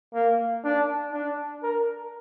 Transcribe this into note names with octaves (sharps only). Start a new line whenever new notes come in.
A#3
D4
D4
A#4